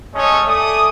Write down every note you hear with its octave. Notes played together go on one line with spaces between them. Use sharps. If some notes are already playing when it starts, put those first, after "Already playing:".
G#3 A3 C#4 A4 C#5 D#5
A3 D5 G#5 D#6